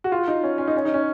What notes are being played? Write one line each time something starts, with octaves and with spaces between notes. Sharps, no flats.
F#4
F4
D#4
C#4
C#4
D#4
C#4
D#4
C#4